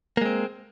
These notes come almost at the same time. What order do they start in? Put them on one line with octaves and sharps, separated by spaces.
A#3 G#3 C4